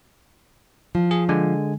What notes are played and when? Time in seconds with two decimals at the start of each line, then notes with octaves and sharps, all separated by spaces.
0.95 F3
1.11 G#4
1.29 D3 G#3 G#5